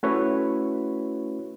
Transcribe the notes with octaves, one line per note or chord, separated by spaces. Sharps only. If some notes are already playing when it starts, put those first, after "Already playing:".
A3 C#4 E4 F#4 B4 C#5